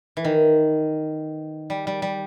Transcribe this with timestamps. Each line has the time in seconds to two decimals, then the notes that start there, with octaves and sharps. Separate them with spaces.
0.17 E3
0.25 D#3
1.70 G3
1.87 G3
2.02 G3